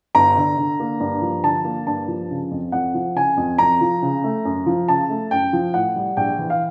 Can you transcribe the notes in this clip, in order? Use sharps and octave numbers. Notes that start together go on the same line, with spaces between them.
G1 A#5
D3
D3
A#3
G2
F3
D3 A5
A#3
G2 A5
F3
C#3
F2
F2 F#5
F3
C#3 G#5
F2
F2 A#5
F3
C#3
A3
F#2
F3
C#3 A5
A3
F#2 G5
F3
A2 F#5
G3
A#1 G5
E3
F5